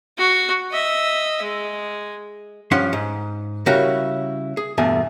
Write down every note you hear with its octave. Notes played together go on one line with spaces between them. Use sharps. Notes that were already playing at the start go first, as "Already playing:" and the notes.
F#4
D#5 E5
G#3
G2 F3 C#4 F#5 C6
G#2
C#3 G3 C#4 E4 F#4 A#4
G#4
E2 G2 B2 A3 G#5